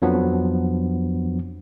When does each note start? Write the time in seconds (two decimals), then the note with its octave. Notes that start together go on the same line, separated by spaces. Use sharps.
0.02 F2 F3 F#3 B3 D4